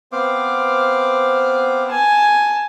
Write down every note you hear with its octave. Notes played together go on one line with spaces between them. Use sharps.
B3 C4 C5 F5 D6
G#5 A5